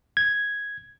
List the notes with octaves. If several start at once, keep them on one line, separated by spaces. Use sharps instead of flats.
G#6